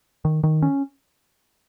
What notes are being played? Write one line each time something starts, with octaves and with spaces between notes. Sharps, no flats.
D#3
D#3
C#4